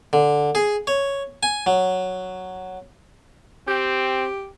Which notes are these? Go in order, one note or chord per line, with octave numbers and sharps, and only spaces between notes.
D3
G#4
C#5
G#5
F#3
C4 G4